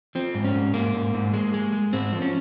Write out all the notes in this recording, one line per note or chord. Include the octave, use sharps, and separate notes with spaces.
F3 C4
G#2
C#4
G#2
G#2 A#3
G#2
G#2
G#3
G#3
G#3
G#2 C4
F3
C#4